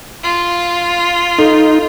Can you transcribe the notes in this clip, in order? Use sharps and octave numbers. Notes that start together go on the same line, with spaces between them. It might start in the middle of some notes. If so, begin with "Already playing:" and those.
F4
D#4 A4